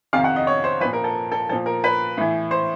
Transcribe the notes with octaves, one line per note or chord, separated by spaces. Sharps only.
F2 C3 D#3 F5
F#5
D#5
C#5
C5
A#2 F3 B4
A#4
A4
A4
A#2 F3 A4
A#4
B4
A2 E3
C5